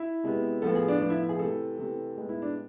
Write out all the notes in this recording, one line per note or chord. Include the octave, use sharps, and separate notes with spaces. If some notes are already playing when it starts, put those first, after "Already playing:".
Already playing: E4
C3 G#3 B3
A2 F3 B3 A4
G#4
D4
A2 F3 B3 D4
E4
G#4
C3 E3 A3 A4
C3 E3 A3
A2 G#3 B3
E4
D4